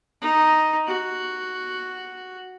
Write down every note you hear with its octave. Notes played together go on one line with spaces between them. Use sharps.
D#4
F#4